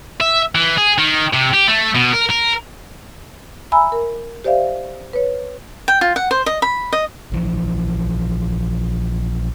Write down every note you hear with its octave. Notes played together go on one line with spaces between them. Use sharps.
E5
E3
G#4
D#3
C3
G4
A3
B2
A#4
A#4
E5 G#5 A#5 B5 E6
A#4
G4 C5 D5 E5 F5
B4 C#5
G5
F4
F#5
C5
D#5
B5
D#5
A#1 E3 F3